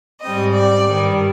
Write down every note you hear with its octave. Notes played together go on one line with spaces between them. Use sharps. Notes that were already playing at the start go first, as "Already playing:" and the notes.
G#2 G3 C4 D#5
D5
G2 D#3 G3